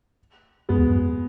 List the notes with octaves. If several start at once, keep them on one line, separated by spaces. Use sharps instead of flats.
F#2 G#3 B3
E2
F#2